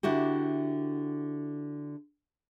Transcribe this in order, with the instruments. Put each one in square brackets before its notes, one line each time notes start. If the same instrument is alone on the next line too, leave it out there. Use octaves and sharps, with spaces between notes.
[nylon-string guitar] D3 E4 F#4 G4